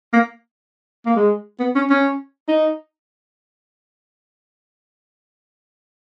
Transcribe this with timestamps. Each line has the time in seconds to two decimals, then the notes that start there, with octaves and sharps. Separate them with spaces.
0.13 A#3
1.06 A#3
1.16 G#3
1.60 B3
1.75 C#4
1.89 C#4
2.48 D#4